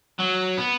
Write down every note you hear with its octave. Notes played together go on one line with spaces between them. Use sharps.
F#3
B3